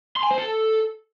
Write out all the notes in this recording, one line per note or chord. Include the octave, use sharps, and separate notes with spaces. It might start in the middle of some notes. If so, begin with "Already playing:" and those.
C6
G#5
C5
A4